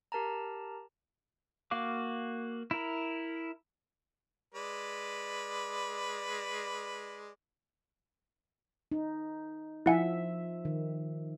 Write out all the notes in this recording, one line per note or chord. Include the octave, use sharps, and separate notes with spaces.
G4 A#4 A5 A#5
A#3 F#4 F5 D6
E4 A#4
G#3 B4 D5
D#4
F3 E4 E5 F#5 G#5
D#3